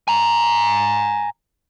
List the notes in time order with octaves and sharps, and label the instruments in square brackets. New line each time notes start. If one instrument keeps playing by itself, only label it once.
[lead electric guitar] G#5 A#5